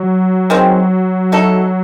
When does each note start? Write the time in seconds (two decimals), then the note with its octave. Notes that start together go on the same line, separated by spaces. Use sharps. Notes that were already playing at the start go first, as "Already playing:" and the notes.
Already playing: F#3
0.50 D#3 G#3 C4
1.32 A3 D#4 A4